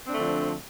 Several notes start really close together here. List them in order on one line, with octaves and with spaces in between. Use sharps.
C4 D4 A3 D3 F3